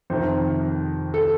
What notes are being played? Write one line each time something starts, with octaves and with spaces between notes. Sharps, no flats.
F2 C3 D#3 C5
A4